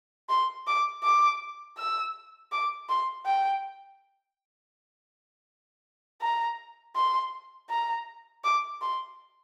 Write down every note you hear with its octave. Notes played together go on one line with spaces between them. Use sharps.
C6
D6
D6
E6
D6
C6
G5
A#5
C6
A#5
D6
C6